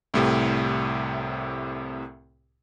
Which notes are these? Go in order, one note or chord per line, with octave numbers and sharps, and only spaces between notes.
C2 A2 C3